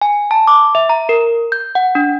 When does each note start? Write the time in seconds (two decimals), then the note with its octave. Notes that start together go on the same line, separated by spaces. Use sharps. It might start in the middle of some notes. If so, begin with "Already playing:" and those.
0.02 G#5
0.31 A5
0.47 D6
0.75 E5
0.89 A#5
1.09 A#4
1.52 G6
1.75 F#5
1.95 D4